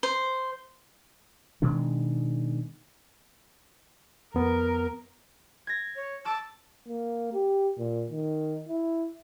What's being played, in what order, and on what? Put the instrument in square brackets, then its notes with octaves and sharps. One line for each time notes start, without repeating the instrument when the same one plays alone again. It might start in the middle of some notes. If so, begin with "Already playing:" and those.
[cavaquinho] C5
[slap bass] B2 D#3 G#3 D4
[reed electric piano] F2 B3 [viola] A#4
[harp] G#6 A#6
[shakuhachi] C#5
[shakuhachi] A5 [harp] D6 E6
[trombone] A#3
G4
A#2
D#3
E4